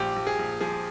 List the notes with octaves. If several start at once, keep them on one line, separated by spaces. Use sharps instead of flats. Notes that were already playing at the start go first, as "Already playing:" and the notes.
Already playing: A#1 G4
A#1
G#4
A#1
F3 G#4